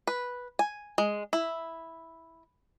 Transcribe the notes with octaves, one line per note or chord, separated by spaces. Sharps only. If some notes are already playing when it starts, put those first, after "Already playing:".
B4
G#5
G#3
E4